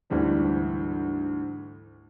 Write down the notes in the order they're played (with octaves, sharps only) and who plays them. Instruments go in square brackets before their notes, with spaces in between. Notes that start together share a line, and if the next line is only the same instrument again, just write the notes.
[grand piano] D2 G#2 E3 G3 C4